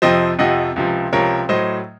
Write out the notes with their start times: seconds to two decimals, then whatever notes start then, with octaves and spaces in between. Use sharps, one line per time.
0.02 F2 C3 F3 C5 D#5
0.39 F2 C3 F3 D#5 F#5
0.76 C#2 C3 F3
1.13 C#2 C3 F3 A#4 C#5
1.49 A2 F#3 C5 D#5